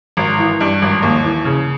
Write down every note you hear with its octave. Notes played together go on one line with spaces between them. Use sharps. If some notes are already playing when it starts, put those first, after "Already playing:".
G#1
E3
G2
G#1
D#2
E3
C#3